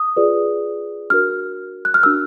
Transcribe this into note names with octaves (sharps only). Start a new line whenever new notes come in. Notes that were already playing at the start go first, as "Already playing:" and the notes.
Already playing: D#6
F4 G#4 B4 D5
D4 F#4 A#4 F6
F#6
F6
D4 F#4 A#4 E6